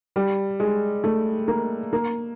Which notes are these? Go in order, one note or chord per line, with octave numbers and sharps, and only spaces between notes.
G3
G#3
A3
A#3
A#3